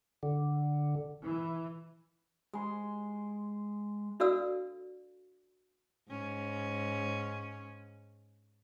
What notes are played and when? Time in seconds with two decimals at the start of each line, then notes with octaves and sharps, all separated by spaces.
0.23 D3
1.22 E3
2.53 G#3 C6
4.20 D4 F#4 A4 D5 F5 E6
6.09 G#2 C#4